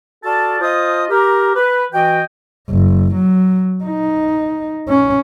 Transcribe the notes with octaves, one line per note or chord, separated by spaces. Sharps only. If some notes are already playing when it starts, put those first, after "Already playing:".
F#4 A4 D5 F5 A5
F4 C5 D#5 F5 A5 D#6
G4 A#4
B4
E3 F#4 D#5 G5
F#1
F#3
D#4
C#4